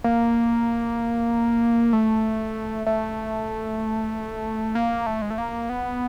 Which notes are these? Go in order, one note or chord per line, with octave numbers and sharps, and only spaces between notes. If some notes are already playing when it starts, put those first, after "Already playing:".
A#3
A3
A3
A#3
A3
G#3
A3
A#3
B3